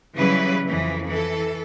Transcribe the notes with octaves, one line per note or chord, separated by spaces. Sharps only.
C#3 E3 F#3 G3 E4 B4
F2 E3
E3 A4